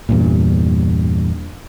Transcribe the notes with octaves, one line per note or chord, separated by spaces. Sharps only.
E2 G2 A#2